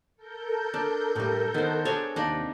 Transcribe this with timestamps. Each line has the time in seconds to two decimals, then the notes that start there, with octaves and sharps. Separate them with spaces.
0.16 A4 A#4 G6
0.74 D4
1.16 A2 G3
1.54 D#3 B3 C5
1.85 D4 G#4 A4 C#5
2.16 D#2 C3 D4 D#4 B5